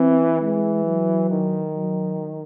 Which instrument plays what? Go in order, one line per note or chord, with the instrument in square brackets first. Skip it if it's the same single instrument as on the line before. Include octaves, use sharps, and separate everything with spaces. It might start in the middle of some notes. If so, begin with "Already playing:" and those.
Already playing: [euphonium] E3 [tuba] C4
[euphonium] E3 [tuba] G#3
[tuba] F#3
[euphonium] D#3
[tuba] F#3